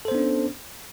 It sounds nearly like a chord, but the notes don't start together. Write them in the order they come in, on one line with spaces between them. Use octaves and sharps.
A4 C5 B3 D4 C#4